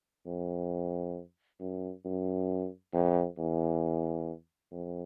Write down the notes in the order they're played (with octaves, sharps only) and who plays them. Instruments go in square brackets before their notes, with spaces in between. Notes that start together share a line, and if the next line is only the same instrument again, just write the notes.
[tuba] F2
F#2
F#2
F2
E2
F2